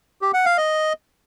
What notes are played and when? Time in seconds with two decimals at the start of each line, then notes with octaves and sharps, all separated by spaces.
0.22 G4
0.34 F#5
0.46 F5
0.58 D#5